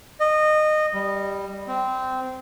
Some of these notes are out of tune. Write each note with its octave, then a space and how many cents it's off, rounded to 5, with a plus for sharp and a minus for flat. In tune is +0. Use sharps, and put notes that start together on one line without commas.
D#5 -20
G3 +5
C4 -15